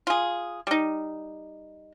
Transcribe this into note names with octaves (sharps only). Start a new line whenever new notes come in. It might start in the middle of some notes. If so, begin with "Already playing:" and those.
F4 G#4
G3 D#4